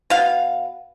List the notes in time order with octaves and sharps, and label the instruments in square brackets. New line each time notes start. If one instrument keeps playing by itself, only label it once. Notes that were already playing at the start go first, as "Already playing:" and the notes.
[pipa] B2 F5